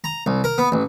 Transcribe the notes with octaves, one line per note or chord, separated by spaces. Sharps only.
A#5
C2
A#4
B3
A1